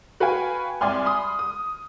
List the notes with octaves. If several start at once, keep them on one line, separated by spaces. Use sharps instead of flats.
F#4 B4 F5 G5 G#5
C2 D5 G#5 C6 F6
B5 C6 D#6
D#6